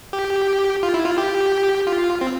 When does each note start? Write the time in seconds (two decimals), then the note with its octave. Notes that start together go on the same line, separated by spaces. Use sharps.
0.13 G4
0.83 F4
0.94 E4
1.06 F4
1.18 G4
1.87 F4
2.21 C4